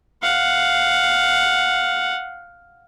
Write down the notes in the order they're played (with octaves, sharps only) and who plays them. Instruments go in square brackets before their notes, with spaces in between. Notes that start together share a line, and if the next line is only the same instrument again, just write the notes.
[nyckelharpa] F5 F#5